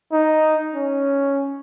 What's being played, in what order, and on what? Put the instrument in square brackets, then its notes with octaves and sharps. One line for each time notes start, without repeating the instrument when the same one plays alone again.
[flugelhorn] D#4
C#4